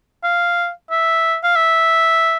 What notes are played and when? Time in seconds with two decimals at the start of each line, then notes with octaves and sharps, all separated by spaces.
0.24 F5
0.91 E5
1.43 F5
1.56 E5